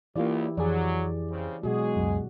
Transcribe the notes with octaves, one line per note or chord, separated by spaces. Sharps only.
C#2 E3 A#3 E4 F4 G4 D5
F2 E3 F#3 G#4 D5
C#3 C4
B2 F#3 G#3 F#4 G#4
C#2 F#2